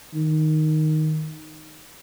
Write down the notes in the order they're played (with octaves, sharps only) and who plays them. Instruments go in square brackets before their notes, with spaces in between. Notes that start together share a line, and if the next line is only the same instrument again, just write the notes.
[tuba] D#3